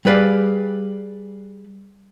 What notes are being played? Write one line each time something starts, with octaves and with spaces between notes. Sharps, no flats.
G3 G#4 B4 D5 F5